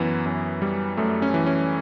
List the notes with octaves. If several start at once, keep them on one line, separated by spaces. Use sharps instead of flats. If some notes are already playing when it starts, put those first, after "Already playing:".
Already playing: F#2 E3 B3
F#2
G3
F#2 A3
C#4
E3
C#4